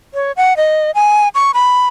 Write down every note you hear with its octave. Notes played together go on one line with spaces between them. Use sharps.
C#5
F#5
D#5
G#5
C#6
B5